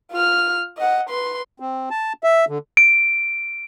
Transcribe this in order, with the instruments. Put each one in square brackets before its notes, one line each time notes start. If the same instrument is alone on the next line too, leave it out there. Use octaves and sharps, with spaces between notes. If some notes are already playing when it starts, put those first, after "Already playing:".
[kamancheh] F4 F6
D#5 F#5
B4 C6
[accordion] C4
A5
E5
D3
[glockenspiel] D7